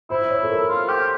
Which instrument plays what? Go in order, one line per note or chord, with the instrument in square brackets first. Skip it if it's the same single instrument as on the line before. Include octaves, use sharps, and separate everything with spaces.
[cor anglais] E4 [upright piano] C5
[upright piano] C#5
A4
A#4
[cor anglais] F4
G4